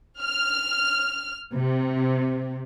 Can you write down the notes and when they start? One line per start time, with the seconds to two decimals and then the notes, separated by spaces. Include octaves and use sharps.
0.21 F6
1.54 C3